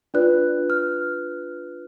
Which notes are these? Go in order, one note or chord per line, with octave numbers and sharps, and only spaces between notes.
D4 F4 B4 D5 F#6
F6